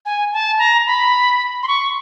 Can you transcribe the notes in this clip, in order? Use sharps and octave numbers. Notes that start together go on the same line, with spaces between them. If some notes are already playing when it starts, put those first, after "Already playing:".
G#5
A5
A#5
B5
C6
C#6